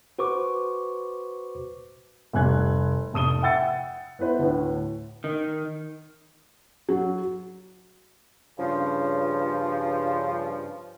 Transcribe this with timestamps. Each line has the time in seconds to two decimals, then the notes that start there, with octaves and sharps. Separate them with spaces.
0.19 F#4 B4 C5 C#6 D6
2.33 F1 G3 G#5 F#6 G#6
3.13 F1 A5 D#6 D#7 G7
3.42 E5 F#5 G5 E6 A6 C#7
4.19 B3 E4 B4 C5
4.39 D2 A2
5.24 D#3
6.89 F#3
8.59 G2 C#3 F3